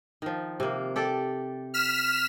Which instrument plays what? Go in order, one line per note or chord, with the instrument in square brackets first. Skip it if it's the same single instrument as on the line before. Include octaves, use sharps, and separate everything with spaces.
[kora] D#3 F3
C3 A#3
G4 A4 D5
[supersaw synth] F6 B6 E7